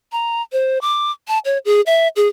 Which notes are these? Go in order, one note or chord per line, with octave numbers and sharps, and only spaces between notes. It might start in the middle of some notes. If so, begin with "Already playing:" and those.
A#5
C5
D6
A5
C#5
G#4
E5
G#4